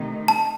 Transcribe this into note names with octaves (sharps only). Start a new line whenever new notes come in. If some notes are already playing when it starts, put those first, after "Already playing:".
Already playing: C3 D#3 A3 D#4
A5